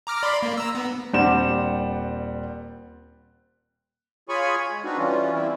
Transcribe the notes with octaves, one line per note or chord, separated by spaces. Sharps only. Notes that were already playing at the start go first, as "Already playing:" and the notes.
A#5 D6 F6
D5 B5 C6
A#3
A#5 E6
B3
D#1 G3 C4 D4 F#5 E7
F4 G#4 C#5 G#5 B5 C#6
G#3
C4 D4 D#4 F#4 B4
E3 G3 C#4 F4
G3 C4 E4